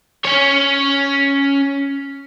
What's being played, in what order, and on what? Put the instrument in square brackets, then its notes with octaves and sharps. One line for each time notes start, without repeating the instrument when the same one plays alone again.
[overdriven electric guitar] C#4 C#5